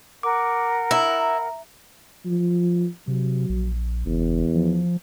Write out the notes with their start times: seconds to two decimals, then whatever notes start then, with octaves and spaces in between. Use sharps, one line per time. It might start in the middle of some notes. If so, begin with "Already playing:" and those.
0.23 A#4 F#5 D6
0.91 E4 A#5
2.26 F3
3.08 C3 F#3
3.49 A#1
4.06 F#1 E2
4.55 F3